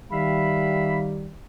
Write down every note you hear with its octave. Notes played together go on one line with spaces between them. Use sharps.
D#3 G3 E5 F5 B5